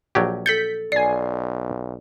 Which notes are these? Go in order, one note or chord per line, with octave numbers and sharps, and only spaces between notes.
A#1 F#3 G4
A4 G6 A6 B6 C#7
B1 D5 G#5 C7